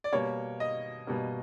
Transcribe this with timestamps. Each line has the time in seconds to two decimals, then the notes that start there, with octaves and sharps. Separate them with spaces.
0.04 D5
0.13 B2 G3 A#3 C#5
0.60 D#5
1.07 B2 G3 A#3